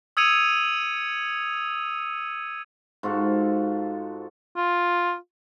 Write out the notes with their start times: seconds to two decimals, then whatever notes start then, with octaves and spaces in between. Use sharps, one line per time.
0.17 D#6 E6 G#6 C#7 D#7 F7
3.03 G#2 F4 F#4 A4
4.57 F4